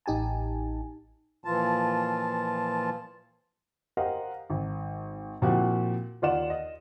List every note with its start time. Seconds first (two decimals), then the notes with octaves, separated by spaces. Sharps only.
0.06 A1 D#4 G4 G#5 A5
1.44 A#2 E3 F3 F4 A5
3.97 G4 A#4 C5 D#5 F5 F#5
4.50 G#1
5.42 A#2 F3 C4 E4 F#4 G4
6.22 D#2 F4 D5 F#5 E7
6.50 D#5